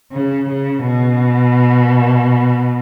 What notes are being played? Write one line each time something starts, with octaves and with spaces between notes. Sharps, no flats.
C#3
C#3
B2